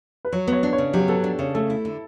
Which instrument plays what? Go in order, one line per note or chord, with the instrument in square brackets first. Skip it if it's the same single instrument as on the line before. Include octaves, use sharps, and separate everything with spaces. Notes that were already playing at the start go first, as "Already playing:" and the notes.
[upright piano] B4
[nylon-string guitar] F#3 [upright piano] C#5
[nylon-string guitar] B3 [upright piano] C#5
[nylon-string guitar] D4
[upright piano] C#5
[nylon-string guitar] C#3
[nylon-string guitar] F#3 [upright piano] G4
[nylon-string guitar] B3 [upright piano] A4
[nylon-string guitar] D4
[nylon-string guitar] C#3 [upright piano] C#5
[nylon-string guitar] A3 [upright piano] A4
[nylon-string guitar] E4
D3